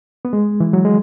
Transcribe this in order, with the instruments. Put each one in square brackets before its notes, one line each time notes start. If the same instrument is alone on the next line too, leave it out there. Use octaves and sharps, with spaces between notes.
[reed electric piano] B3
G#3
E3
F#3
G#3